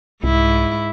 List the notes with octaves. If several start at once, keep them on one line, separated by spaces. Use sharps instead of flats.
C2 G#2 E4